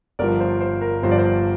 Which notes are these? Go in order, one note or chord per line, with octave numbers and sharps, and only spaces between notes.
G1 G2 F3 A#4 D5
C5
C5
A#4
G1 G2 F3 C5
D5
C5